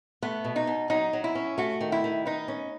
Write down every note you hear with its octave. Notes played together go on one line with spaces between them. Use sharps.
A3 B3
B2
D#4
B2
F#3 D#4
F#3
E4
C#4
A3 F#4
D#3
E4
D#3
D#4 B4
C#4